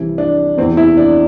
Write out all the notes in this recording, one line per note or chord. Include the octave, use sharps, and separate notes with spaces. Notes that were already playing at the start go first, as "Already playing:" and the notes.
Already playing: C2 C3 E3 E4
D4
E2 C3 E3 C4
E4
D4